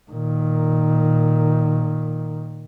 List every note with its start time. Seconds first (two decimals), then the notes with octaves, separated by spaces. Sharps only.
0.11 A#2 D#3